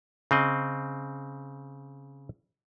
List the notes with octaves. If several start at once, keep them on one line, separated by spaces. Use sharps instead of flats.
C#3 C4 D#5